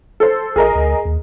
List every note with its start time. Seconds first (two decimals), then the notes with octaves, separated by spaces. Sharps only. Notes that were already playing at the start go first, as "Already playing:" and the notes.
0.20 A4 C5
0.56 A#1 G#4 A#4 D#5
0.75 D2
1.05 D#2